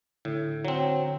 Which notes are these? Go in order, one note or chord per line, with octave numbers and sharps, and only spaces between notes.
A2 D3
F#3 C4